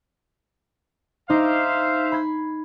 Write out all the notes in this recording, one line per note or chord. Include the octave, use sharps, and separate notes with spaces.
D#4 C5 E5 F5 D6
B5 G#6 C7